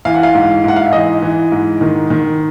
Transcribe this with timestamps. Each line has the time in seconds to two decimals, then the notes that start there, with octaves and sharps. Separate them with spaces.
0.05 E3 F5
0.15 F#5
0.23 F5
0.35 G#2
0.64 G#2 F#5
0.76 F5
0.85 E5
0.93 E3 D#5
1.22 E3
1.52 G#2
1.81 D#3
2.10 D#3